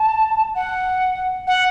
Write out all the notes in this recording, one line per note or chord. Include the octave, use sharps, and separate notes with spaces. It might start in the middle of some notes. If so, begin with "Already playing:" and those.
Already playing: A5
F#5
F#5